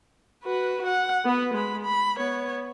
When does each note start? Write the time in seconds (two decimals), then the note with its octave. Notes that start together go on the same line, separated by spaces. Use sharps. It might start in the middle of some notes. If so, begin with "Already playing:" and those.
0.44 F#4 B4
0.87 F#5
1.25 B3 B4
1.54 G#3 B5
1.83 B5
2.17 B3 C#5